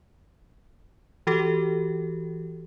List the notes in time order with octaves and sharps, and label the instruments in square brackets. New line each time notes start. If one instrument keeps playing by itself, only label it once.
[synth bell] E3 F#4 G4 A4